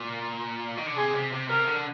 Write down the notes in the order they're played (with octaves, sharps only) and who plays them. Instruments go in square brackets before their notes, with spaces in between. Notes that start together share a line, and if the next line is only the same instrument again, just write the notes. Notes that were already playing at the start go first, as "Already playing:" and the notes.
Already playing: [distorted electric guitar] A#2
D#3
D3
[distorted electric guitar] C3 [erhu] G#4
[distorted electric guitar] C3
C3
[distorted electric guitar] C3 [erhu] A#4
[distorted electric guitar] D3